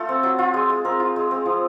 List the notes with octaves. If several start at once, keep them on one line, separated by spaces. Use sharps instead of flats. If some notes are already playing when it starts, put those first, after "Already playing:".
Already playing: A3 F4 A4
C4
F#3
F4
G#3
G#3
C4 A#4
F4
G#3
C4
F3